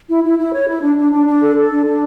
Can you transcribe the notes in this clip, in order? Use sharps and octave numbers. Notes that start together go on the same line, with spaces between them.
E4
E4
E4
C#5
E4
D4
D4
D4
D4
A4
A4
D4
D4